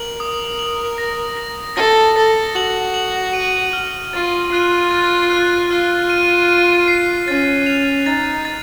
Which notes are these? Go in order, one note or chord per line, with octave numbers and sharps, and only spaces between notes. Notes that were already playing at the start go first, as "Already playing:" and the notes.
Already playing: A#4 F#7
D#6
F#7
A#6
A#6
A4 A#6
A4 A#6
F#4 F#7
F#7
D#7
F6
F4 A6
F4 F#6
A6
F#6
F4 F6
D#7
D#7
C7
C#4 A6
F7
D#4 A6
A6